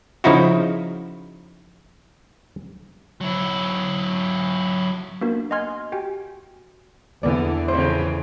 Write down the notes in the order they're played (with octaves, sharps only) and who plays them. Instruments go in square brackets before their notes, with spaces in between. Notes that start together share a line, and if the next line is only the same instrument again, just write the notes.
[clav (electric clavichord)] C#3 F3 D#4 E4 F#4
[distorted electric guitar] F#3 E4
[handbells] A#3 B3 D4 F#4 A#4
D#5 F#5 G#5 C6 F6 G#6
F#4 G4 G5 G#5
[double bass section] E2 E3 [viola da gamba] D3 [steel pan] B3 D5
[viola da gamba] F2 A2 C#3 [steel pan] C5